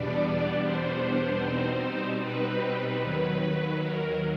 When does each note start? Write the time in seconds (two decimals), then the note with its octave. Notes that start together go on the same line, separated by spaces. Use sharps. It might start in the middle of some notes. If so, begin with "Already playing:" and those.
Already playing: E2 B2 G3 B3 D4 D5
0.61 C5
1.42 B2 G3 C4 D#4
2.21 B4
3.02 D#2 D#3 F#3 B4
3.81 A#4